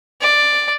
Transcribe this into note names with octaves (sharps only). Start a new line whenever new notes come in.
D5